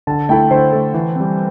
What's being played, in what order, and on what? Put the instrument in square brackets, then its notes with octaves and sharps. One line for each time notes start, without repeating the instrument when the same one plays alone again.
[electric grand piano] D3 [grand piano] A5
[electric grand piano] A3 E4 A4 [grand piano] G5
[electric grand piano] D3 [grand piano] C5
[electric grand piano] A3 E4 A4
E3
G3 C4